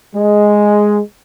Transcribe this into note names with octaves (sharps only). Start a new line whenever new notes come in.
G#3